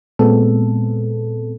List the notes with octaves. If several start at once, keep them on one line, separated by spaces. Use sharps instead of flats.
A#2 G#3 B3 C4 A4